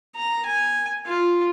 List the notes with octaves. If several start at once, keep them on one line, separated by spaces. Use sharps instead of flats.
A#5
G#5
F4